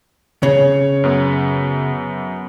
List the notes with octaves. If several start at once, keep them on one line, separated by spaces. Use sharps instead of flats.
C#3 C#5
F#2 B3